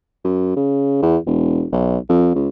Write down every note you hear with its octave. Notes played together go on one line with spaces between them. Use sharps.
F#2
C#3
E2
E1
B1
F2
C#2